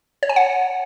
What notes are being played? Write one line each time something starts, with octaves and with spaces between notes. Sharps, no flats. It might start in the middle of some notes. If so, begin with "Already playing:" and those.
C#5
G#5
F#5